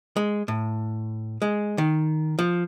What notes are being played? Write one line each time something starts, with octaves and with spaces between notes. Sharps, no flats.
G#3
A2
G#3
D#3
F3